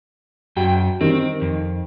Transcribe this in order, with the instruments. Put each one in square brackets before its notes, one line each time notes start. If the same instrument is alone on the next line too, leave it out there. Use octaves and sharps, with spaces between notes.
[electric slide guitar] F#2 G5 [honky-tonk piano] F#4
[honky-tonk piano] D#3 G3 [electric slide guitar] C4
[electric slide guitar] F2